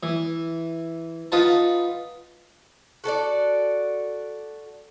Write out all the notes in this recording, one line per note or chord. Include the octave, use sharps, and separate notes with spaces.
E3
D#4 F4 B4 F#5 A5
F#4 A4 C#5 D5